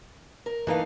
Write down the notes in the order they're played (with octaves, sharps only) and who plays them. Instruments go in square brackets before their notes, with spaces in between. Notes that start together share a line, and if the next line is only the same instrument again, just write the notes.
[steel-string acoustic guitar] A#4
[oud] E3 A#3 [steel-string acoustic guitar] A3 D#4 F5